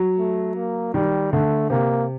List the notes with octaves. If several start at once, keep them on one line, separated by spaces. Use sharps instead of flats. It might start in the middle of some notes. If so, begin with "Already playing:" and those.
Already playing: F#3
A3
A#3
D#3 G3
D3 A3
C3 A#3